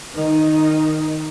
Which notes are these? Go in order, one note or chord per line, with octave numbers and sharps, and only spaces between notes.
D#3 D#4